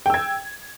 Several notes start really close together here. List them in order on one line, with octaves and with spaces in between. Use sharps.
G5 E6 G#6